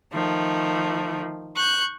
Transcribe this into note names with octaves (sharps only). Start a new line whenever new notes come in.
D#3 F3 A3
C#6 F#6 G6